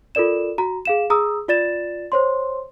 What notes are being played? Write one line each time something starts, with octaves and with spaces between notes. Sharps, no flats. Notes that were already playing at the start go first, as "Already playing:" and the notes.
F4 A4 A#4 D5 E7
F#4 A#5
G#4 F5 E7
G#4 A#5 D#6 E6
F4 D5 A6 E7
C5 C#5 C6